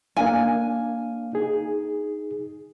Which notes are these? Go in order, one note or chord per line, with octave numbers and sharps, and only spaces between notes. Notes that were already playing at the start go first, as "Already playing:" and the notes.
A#3 D4 F5 G#5
D#4 G#4